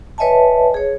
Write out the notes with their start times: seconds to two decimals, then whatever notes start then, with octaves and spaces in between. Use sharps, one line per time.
0.18 B4 C#5 D#5 E5 G#5 A5
0.74 G#4 C#5